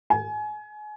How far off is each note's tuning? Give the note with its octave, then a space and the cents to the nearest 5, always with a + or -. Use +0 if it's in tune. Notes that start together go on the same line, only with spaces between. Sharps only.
G#5 +30